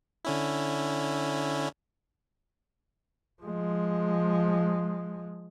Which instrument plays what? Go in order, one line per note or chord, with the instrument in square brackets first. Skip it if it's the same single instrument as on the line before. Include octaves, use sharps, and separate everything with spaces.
[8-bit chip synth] D3 C#4 E4
[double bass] F3 G#3